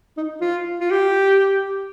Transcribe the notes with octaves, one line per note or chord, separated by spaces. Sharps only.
D#4
F4
F4
G4